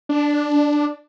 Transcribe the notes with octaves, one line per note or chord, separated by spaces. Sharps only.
D4